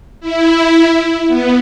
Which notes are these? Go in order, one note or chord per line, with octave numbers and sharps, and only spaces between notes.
E4
B3